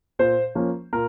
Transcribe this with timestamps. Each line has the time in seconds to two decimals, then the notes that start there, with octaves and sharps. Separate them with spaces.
0.19 A#2 C5
0.55 F3 A#3 C#4
0.93 A#2 A#4